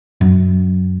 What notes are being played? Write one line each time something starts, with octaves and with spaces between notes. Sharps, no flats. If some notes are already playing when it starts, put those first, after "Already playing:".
F#2